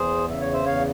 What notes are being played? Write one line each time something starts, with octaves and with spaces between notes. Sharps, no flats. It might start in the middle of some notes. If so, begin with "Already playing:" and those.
Already playing: E2 G#4 C5
C#3 E5
C#5
C5 E5
E2 C#5 F5